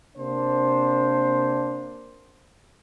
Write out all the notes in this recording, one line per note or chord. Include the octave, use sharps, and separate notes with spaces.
C3 A#3 D4 C5